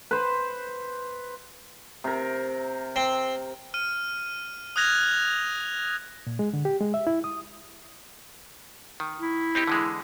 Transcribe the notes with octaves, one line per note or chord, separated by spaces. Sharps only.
B4 C5
C3 A#4
C4
F6 D#7
D#6 F6 F#6 G#6 A#6 F7
A#2
G#3
D3
G4
G#3
E5
E4
D#6
D#3
E4
C4 D#4 G4
D3 E3 G#3